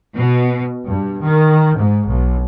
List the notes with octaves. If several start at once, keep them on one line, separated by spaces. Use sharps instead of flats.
B2
G2
D#3
G#2
B1